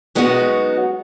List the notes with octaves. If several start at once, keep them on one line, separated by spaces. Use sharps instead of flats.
F#3 G#3 B3 C#4 D#4 F#4